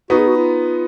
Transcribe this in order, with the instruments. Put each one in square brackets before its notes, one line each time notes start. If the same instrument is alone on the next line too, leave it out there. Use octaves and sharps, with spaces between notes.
[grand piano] B3 D#4 [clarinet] F#4
[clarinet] G#4
F#4
F4